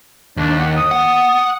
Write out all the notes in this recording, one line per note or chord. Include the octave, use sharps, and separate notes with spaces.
D#2 D4
F#5
D#6
F#5